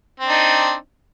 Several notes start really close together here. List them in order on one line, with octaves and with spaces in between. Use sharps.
C4 D4 D#4